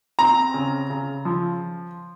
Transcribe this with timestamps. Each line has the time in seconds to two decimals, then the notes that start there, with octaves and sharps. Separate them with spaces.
0.19 C4 A#5
0.54 C#3
0.90 C#3
1.25 F3